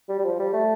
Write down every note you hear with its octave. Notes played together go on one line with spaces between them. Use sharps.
G3
G3
F3
G3
A3